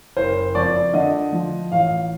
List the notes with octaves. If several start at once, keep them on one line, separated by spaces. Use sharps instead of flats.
F#1 C5
F2 D5
D3 D#5
F3
A1 F5